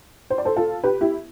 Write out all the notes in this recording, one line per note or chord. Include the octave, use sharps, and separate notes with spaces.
C5
D5
A4 C5
F4 A4
G4 B4
E4 G4